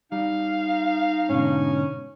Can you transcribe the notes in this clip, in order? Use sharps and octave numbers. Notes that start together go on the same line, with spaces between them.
G3 D#4 F5
G#2 B2 D3 C#4